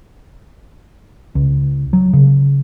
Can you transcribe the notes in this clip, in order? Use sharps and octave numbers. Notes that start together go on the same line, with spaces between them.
C#2
F#3
C#3